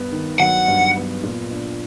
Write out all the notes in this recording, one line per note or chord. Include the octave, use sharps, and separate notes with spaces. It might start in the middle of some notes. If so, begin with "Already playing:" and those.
Already playing: G2 B3
D#3
F#3 F#5
G2
B3
A#2
D4